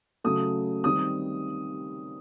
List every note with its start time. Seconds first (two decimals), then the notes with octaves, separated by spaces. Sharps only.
0.24 C#3 F#3 A3 D#6
0.84 D#3 G3 C4 D#6